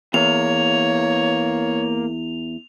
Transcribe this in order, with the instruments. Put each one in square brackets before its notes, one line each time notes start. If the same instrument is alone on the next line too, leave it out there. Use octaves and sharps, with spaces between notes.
[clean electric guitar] E2 [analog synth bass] A#3 [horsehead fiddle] C#5 [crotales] F7